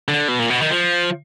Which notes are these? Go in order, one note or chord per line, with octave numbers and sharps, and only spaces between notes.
D3
B2
A#2
B2
D#3
F3